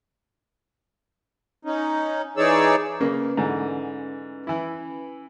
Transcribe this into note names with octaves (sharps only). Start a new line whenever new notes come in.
C#4 D#4
E3 D#4 G#4 C#5 D5 E6
C#3 A#3 C#4 B4
G#2 D3 E3
E3 E4